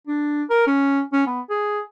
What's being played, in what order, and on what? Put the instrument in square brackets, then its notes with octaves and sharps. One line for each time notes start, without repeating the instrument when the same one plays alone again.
[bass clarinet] D4
A#4
C#4
C#4
B3
G#4